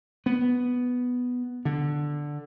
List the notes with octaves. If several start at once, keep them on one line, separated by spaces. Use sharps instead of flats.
B3
D3